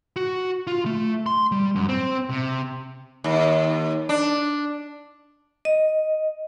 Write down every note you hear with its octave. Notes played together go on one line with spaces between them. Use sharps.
F#4
F4
A3
C6
G3
F#2
C4
C3
D#2
D4
D#5